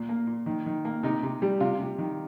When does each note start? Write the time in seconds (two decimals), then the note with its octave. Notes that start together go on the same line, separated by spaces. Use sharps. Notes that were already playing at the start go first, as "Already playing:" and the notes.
Already playing: A#2
0.09 A#3
0.27 A#2
0.46 D#3
0.66 D#3
0.85 A#3
1.03 C3 D#4
1.23 C3
1.42 G3
1.60 C3 F4
1.80 C3
1.98 D#3